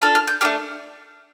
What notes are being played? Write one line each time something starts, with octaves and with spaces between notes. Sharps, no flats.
D4 F4 A4 F6
F6
G6
A3 D4 G4 F6